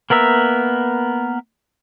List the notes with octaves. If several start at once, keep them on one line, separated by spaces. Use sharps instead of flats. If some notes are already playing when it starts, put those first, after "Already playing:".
A#3 B3 A#4 E5